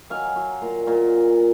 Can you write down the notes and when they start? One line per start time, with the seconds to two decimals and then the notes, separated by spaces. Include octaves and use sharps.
0.10 F#3 F5 G#5
0.36 F#3
0.62 A#2
0.87 A#2